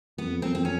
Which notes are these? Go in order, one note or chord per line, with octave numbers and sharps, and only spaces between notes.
F2 B3
C4
C4
C#4